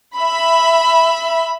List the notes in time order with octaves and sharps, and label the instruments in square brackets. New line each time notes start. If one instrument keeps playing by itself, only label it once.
[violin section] E5 B5